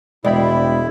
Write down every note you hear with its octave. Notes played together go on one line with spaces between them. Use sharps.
E1 G#3 E4 D5 G5 B5